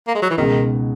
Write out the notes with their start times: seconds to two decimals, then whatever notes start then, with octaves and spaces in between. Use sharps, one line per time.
0.07 A#3
0.15 G#3
0.22 F#3
0.30 E3
0.37 C#2 B2 D#3 G#3 D#4